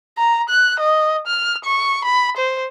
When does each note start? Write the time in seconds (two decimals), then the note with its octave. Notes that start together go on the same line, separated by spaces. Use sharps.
0.18 A#5
0.49 F#6
0.80 D#5
1.27 F6
1.64 C#6
2.05 B5
2.37 C5